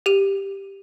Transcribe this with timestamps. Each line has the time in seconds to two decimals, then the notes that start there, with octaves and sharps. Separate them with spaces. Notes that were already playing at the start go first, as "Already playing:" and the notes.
0.06 G4 D#7